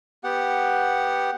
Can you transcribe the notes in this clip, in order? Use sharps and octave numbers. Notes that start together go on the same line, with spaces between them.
B3 G4 F#5